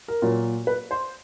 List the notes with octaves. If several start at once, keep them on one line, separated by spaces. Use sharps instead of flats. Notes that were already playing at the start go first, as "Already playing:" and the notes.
A#4
A#2 F#3
B4
C5